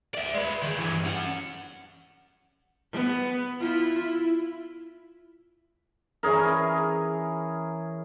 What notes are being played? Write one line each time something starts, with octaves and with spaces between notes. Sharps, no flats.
D5 E5
G#3 B4
D#3 G#4
G2 E3
C#4 F#5
B3
E4 F4
E4
E3 C#4 G#4 A#4